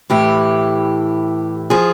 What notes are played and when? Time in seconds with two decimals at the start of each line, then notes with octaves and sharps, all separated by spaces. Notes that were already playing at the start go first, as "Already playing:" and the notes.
0.10 A2 E3 G4
1.70 F3 G#4